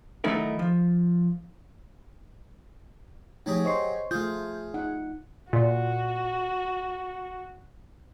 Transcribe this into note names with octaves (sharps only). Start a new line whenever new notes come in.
D#3 F#3 A3 D#4 E4 A#4
F3
F3 F#3 A3 D#4 G4 G#4
C5 D#5 C#6 C7
A3 F4 G#4 F5 G6
D#4 F#5
A#2 F#4